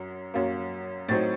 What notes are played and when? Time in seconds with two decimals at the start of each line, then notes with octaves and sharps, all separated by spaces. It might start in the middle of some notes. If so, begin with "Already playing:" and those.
Already playing: F#2 F#3
0.34 F#2 F#3 A#3
1.09 A2 F#3 C4 D#4 A6